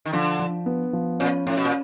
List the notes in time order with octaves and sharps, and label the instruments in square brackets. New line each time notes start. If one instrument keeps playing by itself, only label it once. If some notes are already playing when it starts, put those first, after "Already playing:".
[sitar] D#3
[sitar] D3 [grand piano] F3
[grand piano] F3
B3
F3
[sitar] A#2 [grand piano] C#4
[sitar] A2 [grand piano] C#4
[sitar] B2
A#2